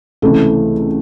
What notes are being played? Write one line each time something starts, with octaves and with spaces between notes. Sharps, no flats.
C#2 C3 E3 A3